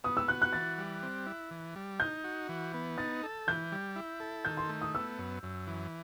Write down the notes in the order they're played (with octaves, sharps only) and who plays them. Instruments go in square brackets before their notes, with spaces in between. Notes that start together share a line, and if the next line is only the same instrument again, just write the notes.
[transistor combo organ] B3 [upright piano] D#6
[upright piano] E6
[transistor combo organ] F#4 [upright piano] F#6
[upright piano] F#6
[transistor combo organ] E3 [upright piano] A6
[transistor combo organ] G3
C4
E4
E3
G3
[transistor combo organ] D#4 [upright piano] G6
[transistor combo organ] F#4
E3
B3
[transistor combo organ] D#4 [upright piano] A6
[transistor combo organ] A4
[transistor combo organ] E3 [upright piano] G6
[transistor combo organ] G3
E4
A4
[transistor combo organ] D#3 [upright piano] G6
[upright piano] C6
[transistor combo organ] A3
[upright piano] D#6
[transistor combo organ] B3 [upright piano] E6
[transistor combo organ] F#2
F#2
E3